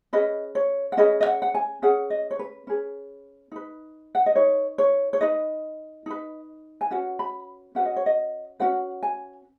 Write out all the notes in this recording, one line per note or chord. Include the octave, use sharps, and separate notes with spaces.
C#4 G#4 B4 D#5
C#5
F#5
C#4 G#4 B4 D#5
D#5
F#5
F#5
G#5
C#4 G#4 B4 F#5
D#5
C#5
B4
C#4 G#4 B4
D#4 B4
F#5
D#5
D#4 B4 C#5
C#5
C#5
D#4 B4 D#5
D#4 B4
G#5
C#4 F#4 B4 F#5
B5
C#4 F#4 B4 F#5
D#5
C#5
D#5
C#4 F#4 B4 F#5
G#5